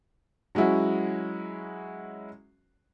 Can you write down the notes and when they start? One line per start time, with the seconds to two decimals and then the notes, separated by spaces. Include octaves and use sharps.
0.55 F#3 G#3 C#4 E4 F#4